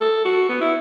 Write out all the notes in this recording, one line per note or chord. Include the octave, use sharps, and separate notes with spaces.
A4
F#4
B3
E4